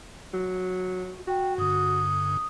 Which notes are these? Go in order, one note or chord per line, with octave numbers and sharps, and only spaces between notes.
F#3
F#4
F#4 G5
G2 D3 D#6